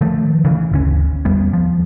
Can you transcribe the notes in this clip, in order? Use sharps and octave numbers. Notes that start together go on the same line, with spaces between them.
D#3 F3 A3
C#3 E3
G1 D2 C#4
E2 G3 B3
F3